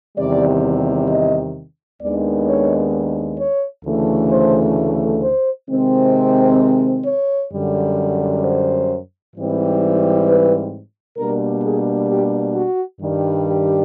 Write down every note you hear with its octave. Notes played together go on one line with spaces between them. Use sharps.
E2 C3 D#3 G3 D5
D#5
D#2 D#3 G#3 B3 D4 D5
C#5
C#5
D2 C#3 E3 A3
C5
C5
C3 D#3 G#3 C4
C5
C#5
F#2 D3 G3
C5
G#2 E3 G3 C4
B4
B2 G3 A#3 D4 A#4
G#4
G4
F#4
G2 D#3 G3
G4